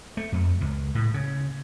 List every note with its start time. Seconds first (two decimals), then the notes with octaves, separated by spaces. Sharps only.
0.17 A3
0.32 F2
0.61 C#2
0.95 A2
1.14 C#3